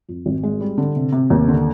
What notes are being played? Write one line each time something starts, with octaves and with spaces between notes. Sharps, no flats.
F2
G#1
G#3
G3
D3
C3
C3
D#2
D3